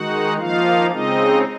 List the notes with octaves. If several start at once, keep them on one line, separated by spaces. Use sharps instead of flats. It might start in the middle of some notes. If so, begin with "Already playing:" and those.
Already playing: D#3 G#3 D#4 F#4 F#5
F3 A#3 D#4 F4 F5
C#3 G#3 C4 D#4 D#5